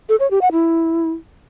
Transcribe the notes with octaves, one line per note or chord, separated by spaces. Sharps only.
A4
C#5
G4
F#5
E4